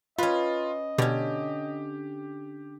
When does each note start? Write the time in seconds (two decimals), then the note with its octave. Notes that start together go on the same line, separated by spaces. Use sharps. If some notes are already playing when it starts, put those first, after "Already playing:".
0.18 C#4 F4 B4 D#5
0.98 B2 D3 C#4 G4